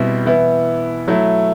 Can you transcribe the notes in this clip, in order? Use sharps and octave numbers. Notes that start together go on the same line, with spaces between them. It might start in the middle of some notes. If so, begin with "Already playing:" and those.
Already playing: B2 G3 C4 E4
E3 B3 E4
F#3 A3 E4